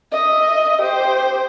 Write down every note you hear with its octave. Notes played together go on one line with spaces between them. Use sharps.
D#5 E5
G4 C5